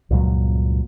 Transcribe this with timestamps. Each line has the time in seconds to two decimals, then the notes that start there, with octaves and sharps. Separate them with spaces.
0.11 C#2 G2 A#2 F#3